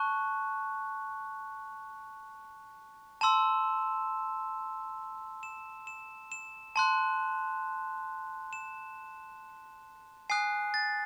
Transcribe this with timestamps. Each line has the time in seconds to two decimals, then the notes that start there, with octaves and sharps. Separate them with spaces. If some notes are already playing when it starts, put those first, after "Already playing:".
Already playing: A5 C#6 F#6
3.21 A5 C6 E6 E7
5.43 E7
5.87 E7
6.32 E7
6.76 A5 C6 F#6
8.53 E7
10.30 G#5 D#6 F#6 C7
10.74 A6